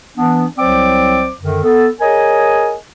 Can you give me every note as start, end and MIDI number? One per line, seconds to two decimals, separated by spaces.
0.17 0.45 52
0.17 0.45 59
0.17 0.45 62
0.58 1.29 36
0.58 1.29 54
0.58 1.29 60
0.58 1.29 72
0.58 1.29 74
0.58 1.29 86
1.40 1.61 42
1.40 1.61 50
1.40 1.61 51
1.63 1.88 59
1.63 1.88 69
2.01 2.74 68
2.01 2.74 70
2.01 2.74 73
2.01 2.74 75
2.01 2.74 80